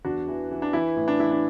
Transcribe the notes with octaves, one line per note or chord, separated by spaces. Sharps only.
E2 D4 F#4
E3
E3
D4
E3 E4
A2
D4
E3 E4
D4